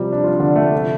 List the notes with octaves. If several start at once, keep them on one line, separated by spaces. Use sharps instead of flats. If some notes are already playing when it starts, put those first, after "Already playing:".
Already playing: C3 F3 G3 G4
D4
F3 F4
D3 D4
A3
C3 F3